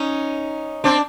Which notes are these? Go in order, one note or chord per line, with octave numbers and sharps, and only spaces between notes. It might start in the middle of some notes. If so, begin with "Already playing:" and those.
Already playing: C#4 D#4
C4 D4